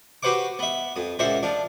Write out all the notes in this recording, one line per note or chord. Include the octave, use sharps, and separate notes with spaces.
F#4 G4 B4 C5 F#5 D6
B3 E5
F2 D#6
C#2 A#2 C5 E5 F#5
F3 D4